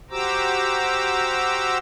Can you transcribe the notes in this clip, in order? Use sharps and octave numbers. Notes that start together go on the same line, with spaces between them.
F#4 G4 C5 A#5 D6 E6